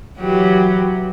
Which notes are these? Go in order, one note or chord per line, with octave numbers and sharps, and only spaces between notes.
E3 F#3 G4